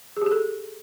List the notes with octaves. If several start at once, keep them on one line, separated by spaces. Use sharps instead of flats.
G#4
G4
G#4
A4